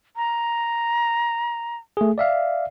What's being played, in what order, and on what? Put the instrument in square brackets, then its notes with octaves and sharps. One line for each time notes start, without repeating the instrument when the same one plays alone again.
[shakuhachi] A#5
[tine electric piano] A3 G#4
D5 E5 F5